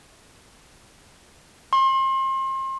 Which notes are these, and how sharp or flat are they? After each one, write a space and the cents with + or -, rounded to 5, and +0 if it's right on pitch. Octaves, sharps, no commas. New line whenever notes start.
C6 +35